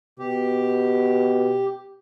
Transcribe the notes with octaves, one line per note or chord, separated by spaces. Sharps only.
B2 G4